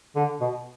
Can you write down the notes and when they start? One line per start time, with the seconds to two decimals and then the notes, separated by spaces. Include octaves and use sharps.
0.16 D3
0.40 B2